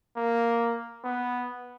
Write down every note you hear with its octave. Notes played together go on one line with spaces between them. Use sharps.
A#3
B3